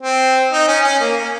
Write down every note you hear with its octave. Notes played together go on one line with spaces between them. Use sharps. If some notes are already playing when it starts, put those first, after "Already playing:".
C4
D#4
C#4
C#4
A#3
C#4